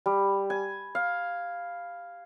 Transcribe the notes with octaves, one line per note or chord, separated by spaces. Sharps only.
G3
G#5
F5